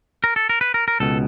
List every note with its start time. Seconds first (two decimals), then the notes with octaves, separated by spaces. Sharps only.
0.24 A#4
0.36 A4
0.49 A#4
0.61 B4
0.74 A#4
0.88 A#4
1.00 C#2 B2 A4